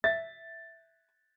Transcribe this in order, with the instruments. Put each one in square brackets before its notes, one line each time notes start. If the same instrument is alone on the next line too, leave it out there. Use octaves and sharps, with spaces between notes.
[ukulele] E5 [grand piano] A6